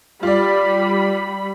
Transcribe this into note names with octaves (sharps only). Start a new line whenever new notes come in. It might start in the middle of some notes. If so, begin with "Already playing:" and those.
G3 F4 D5 B5